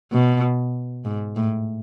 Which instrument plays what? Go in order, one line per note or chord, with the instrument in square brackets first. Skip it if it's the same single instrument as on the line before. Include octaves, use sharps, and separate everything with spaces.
[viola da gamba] B2
G#2
A2